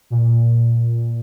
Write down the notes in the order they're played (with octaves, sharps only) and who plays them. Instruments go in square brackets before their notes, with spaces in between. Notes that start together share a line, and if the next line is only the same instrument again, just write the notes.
[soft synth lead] A#2